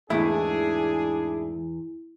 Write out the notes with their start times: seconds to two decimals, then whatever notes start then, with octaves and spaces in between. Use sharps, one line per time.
0.10 E2 G#2 E3 A3 D4 E4 G#4